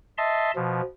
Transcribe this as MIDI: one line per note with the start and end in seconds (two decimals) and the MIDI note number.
0.18 0.51 75
0.18 0.51 76
0.18 0.51 81
0.18 0.51 84
0.56 0.81 47
0.56 0.81 53